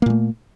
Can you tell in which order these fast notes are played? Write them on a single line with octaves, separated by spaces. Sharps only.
A#3 A#2 A3